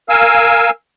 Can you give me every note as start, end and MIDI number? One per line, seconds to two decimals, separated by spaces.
0.09 0.70 70
0.09 0.70 77
0.09 0.70 80
0.09 0.70 88